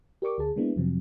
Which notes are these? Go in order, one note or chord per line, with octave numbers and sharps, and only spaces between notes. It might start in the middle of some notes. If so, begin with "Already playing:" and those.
G4 A#4 D5 C#6 D6
D2 G#4 A5
G#3 A#3 B3 D4 E4
F2 C3 F3 F#3 C4